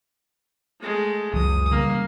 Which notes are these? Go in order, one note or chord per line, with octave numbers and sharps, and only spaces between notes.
G#3 A3
F#1 C#2 E3 F#3 D#6
C#3 G3 A#3